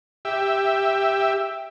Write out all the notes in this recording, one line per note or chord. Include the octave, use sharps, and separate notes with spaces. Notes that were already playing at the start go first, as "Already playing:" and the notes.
G4 E5